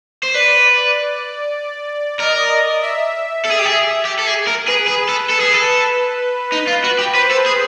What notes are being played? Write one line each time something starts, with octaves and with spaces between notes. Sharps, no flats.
C5
B4 D5
A#4 D#5
E5
A4
G#4
G4
G#4
G4
A4
G#4
A#4
G#4 B4
G#4
A4
A4 B4
G#4
A4
D#4 B4
F4
F#4
G4
B4 C5
A4
G#4